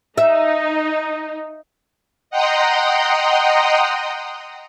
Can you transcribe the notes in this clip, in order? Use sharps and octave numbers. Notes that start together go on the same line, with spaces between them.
D#4 E5
D#5 F#5 G5 A#5 C6 D#6